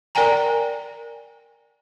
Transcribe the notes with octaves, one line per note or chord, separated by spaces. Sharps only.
A#4 D5 G5 G#5 A#5